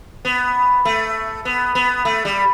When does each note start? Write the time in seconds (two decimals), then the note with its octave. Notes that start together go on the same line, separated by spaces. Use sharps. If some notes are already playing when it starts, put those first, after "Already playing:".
0.25 B3
0.85 A3
1.45 B3
1.75 B3
2.05 A3
2.25 G3